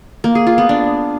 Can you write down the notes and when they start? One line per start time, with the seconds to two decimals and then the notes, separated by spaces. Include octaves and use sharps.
0.24 A#3
0.35 G#4
0.47 F4
0.58 B3
0.69 D4